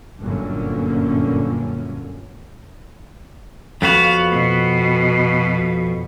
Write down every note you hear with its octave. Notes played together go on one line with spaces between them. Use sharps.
G1 F#2 A#2 D3 A#3 C#4
F2 B3 F#4 F5
B2